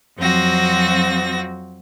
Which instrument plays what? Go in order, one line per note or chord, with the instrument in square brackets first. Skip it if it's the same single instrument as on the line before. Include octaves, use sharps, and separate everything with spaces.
[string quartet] F2 F3 F#3 C4 F#4 A#6